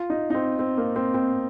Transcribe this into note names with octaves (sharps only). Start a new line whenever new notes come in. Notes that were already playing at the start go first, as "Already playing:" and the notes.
Already playing: F4
D#4
D#4
C4
C4
A#3
C4
C4